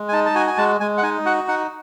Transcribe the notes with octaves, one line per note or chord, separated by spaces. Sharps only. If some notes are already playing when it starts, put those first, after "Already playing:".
Already playing: G#3
G#5
D#4 A5
A5
F#4 G#5
G#5
G#3 A5
G#3 G#5
F#5
D#4 G#5
F#4 F#5
D#4 F#5